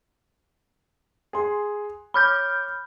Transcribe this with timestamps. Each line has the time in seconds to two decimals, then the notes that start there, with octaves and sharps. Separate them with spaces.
1.33 G#4 C6
2.14 C#5 B5 D6 F6 G6